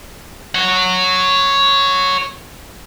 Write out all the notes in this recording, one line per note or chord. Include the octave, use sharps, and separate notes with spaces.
C#5 F#5